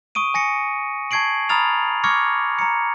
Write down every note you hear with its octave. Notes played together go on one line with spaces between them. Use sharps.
C#6 D#6 D7 D#7
G#5 A#6 C#7
A5 C#6 G#6 C7 D7 F#7
A#5 B5 D#6 F6 A6 F7
C#6 D6 F6 G#6 A#6 C#7
A#5 C#7